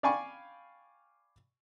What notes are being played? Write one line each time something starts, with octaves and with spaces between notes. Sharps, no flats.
D5 F5 G5 G#5 B5 C#6